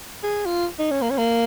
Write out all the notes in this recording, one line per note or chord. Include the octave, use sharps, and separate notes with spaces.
G#4
F4
D#4
C#4
A#3
C#4
A#3